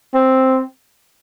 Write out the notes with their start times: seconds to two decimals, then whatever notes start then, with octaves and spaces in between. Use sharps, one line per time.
0.14 C4